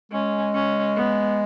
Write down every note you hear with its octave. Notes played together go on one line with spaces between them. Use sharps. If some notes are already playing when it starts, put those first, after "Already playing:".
G#3 C#4
C#4
B3